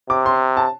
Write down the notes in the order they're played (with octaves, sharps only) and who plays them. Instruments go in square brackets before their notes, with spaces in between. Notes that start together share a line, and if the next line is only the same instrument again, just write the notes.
[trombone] C3 [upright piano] D6
[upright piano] C6
A5